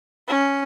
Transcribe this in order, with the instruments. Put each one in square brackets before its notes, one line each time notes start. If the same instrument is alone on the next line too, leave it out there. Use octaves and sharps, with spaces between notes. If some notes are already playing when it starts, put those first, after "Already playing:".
[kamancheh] C#4